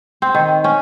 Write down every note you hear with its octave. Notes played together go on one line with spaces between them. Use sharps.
C4
D#3
C#4